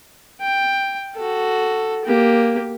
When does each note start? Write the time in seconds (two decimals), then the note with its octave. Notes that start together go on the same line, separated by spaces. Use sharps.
0.41 G5
1.16 F#4 A4
2.05 A#3 G4